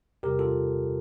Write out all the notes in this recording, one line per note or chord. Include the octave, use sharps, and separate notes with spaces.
E2 C3 G3 G4 A#4
F4 A4